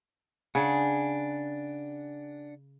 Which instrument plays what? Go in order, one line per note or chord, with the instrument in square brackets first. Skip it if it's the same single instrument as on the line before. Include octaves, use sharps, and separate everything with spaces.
[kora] C#3 [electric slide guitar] D4 F#5 [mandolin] G#4 G#5